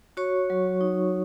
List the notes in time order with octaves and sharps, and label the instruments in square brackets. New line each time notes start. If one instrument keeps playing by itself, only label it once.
[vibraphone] F#4 C#5 C#6
F#3
D#4